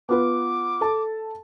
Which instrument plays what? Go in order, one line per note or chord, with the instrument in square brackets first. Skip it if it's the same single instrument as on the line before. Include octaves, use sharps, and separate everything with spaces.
[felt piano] B3 F4 B4 [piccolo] D6
[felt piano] A4 A5